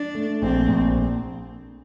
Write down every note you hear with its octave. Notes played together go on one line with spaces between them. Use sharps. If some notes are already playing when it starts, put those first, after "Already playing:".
Already playing: D4
A3
A#1 C4
A#1